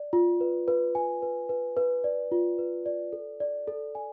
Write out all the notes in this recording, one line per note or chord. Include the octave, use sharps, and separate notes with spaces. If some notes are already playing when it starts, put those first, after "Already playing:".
Already playing: D5
F4
B4
B4
G#5
B4
B4
B4
D5
F4
B4
D5
A4
D5
A4
G#5